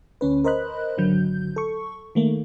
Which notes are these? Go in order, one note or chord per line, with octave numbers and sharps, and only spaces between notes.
D2 C#4 B4
A#4 C5 D#5 B5 F#6
G#1 D3 F#3 G6
A4 C#6
D#3 A3 A#3